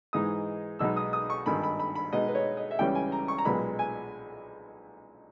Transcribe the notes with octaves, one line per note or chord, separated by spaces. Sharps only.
G#2 E3 G#3 D#4 D#6
B1 B2 G#3 D#4 E6
D#6
D#6
C#6
G#1 G2 D#3 B5
B5
B5
B5
B2 G#3 B3 D#4 D#5
B4
C#5
D#5
E5
C#2 C#3 E3 G3 C#4 G5
G#5
A#5
C#6
A#5
B1 A#2 G#3 B3 B5
G#5